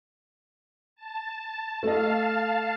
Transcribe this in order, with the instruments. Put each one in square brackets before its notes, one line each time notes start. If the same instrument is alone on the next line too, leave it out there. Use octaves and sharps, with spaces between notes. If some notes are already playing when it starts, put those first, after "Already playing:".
[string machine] A5
[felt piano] A3 D#5 [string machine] F5 A5